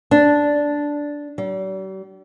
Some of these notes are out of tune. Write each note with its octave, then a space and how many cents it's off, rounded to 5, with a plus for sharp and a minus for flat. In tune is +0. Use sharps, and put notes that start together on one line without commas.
D4 -5
G3 -45